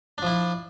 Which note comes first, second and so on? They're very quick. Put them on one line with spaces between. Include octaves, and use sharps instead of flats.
D4 F3 E4